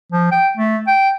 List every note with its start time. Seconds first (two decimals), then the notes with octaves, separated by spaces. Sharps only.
0.12 F3
0.32 G5
0.57 A3
0.87 G5